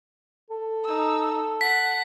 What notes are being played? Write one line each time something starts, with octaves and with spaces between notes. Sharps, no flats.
A4
D#4 E6
F#5 A5 B6